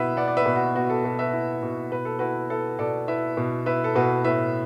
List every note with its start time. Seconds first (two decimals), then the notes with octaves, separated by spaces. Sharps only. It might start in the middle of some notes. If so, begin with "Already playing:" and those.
Already playing: B2 E4 B4 E5 F#5
0.17 B3 D5 F#5
0.28 D5
0.37 B4 E5
0.46 B2
0.56 F#4
0.75 B3 F#4
0.90 A4
1.04 B2 A4
1.19 B4 E5
1.33 E4
1.63 B2
1.92 B2 B4
2.05 A4
2.19 E4 F#4 B4
2.50 B3 A4
2.79 B2 A4 D5
3.08 E4 B4 E5
3.37 B2
3.66 E4 B4 E5
3.84 A4
3.95 B2 F#4 B4
4.24 A2 B4 E5